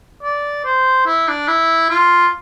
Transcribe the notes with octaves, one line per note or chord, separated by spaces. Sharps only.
D5
C5
E4
D4
E4
F4